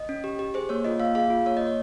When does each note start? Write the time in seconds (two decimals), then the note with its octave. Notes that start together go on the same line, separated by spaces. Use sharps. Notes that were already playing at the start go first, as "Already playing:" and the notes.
Already playing: D#5
0.09 C#4
0.24 G4
0.39 G4
0.54 G#4 C5
0.69 A#3 C#5
0.84 F4 D#5
1.00 A#3 F5
1.15 G#4 F5
1.30 F4
1.46 A#3 C#5
1.57 A#3 D#5
1.67 C#5